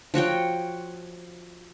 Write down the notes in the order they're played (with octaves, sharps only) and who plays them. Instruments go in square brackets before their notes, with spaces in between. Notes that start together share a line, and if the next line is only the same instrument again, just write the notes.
[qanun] F3 F#4 C#5 G5